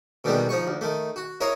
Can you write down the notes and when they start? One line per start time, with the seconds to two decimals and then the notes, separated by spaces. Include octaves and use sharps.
0.24 B2 D3 D#3 G3 G#3 B3
0.49 F3 D#4 C#6
0.67 D2
0.81 D#3 A3
1.16 F#4
1.41 E4 A#4 C#5 D#5 F5